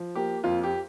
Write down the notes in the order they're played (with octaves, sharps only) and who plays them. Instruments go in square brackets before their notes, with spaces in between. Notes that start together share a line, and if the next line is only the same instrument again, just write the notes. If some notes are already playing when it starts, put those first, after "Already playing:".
Already playing: [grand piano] F3
A#3 G4
F2 F4
G4